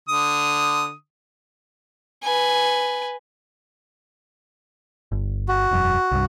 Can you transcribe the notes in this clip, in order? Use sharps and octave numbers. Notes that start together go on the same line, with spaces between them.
D3 D#6
B4 G#5
G1
F#4
E1 F#2
C2 G2